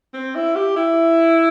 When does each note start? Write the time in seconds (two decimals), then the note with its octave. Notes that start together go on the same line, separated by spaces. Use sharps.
0.14 C4
0.35 E4
0.56 G4
0.76 E4